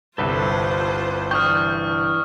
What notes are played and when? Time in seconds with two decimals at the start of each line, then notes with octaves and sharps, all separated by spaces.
0.18 G1 C2 F4 A4 B4 C5 E5
1.31 E3 D4 G5 C#6 D#6 F6